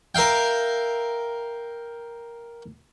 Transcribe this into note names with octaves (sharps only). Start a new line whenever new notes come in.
A#4 E5 F5 G5